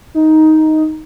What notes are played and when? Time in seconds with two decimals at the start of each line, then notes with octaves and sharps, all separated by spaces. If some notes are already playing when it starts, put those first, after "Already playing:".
0.14 D#4